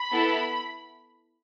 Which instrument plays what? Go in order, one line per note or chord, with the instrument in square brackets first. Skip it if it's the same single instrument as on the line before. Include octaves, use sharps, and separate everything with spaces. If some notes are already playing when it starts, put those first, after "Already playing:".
Already playing: [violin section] B5
B3 E4 A4